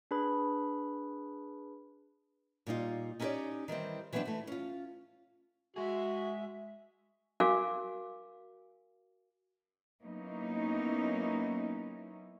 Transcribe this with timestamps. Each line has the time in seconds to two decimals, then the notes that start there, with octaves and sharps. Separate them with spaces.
0.11 D4 G#4 B4 B5
2.67 A#2 G3 D#4 F4
3.20 C#4 D#4 E4 G4 C#5 D5
3.68 D#3 E3 G3 C4
4.13 E3 F#3 A3 B3 C4 D4
4.25 E3 A3
4.47 C#4 F4
5.76 G#3 F#4 G#4 E5
7.40 F#4 A#4 F5 G#5 D6
10.02 F#3 A#3 B3 C#4 D#4 E4